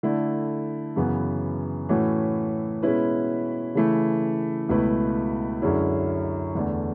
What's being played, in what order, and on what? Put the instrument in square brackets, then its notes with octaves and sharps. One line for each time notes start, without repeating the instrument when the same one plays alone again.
[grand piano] D3 A3 E4
F#2 C#3 E3 B3
A2 E3 A3 C#4 F#4
B2 G#3 C#4 E4 B4
C#3 E3 A3 E4
C#2 B2 A3 E4 B4
F#2 D3 G#3 C#4 E4
E2 D3 A3